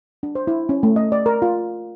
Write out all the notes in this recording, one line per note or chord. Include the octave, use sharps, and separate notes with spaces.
D4
C5
E4
C#4
A3
D#5
D5
A#4
F4